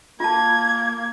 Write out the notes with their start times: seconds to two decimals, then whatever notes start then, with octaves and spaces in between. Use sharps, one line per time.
0.20 A#3 F4 A5 G#6